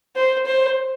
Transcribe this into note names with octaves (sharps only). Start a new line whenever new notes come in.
C5
C5